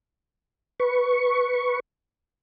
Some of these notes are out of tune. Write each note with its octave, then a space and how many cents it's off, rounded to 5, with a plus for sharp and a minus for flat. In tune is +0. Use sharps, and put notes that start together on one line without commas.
B4 +0 C#6 +0